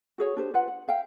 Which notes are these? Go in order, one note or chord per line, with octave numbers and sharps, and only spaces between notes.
F#4 G#4 C#5
D4 G4 C5
F4 B4 F#5
F#5
E5 F5 G5